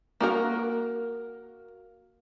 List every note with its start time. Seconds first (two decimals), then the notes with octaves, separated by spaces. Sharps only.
0.20 A#3 F#4 A#4